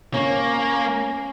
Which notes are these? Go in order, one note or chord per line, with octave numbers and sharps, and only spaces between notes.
A#3 C#4 C#5